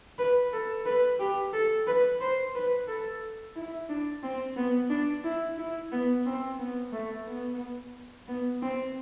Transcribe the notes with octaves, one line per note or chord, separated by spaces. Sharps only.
B4
A4
B4
G4
A4
B4
C5
B4
A4
E4
D4
C4
B3
D4
E4
E4
B3
C4
B3
A3
B3
B3
C4